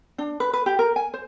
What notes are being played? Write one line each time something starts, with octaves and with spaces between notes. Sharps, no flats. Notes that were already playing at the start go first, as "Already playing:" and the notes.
D4
B4
B4
G4
A#4
G#5
C5